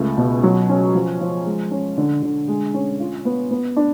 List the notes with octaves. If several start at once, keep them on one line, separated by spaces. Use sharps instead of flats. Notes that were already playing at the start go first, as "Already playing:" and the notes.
Already playing: C#2 A3
B2
F#3
C#4
F3
F3
G#3
C#4
D3
D3
G#3
C#4
F4
B3
B3
D4